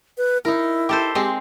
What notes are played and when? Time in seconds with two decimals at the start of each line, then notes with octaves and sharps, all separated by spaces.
0.17 B4
0.45 D#4 E4 A#4
0.89 G4 A4 C5
1.15 G#3 C4 G4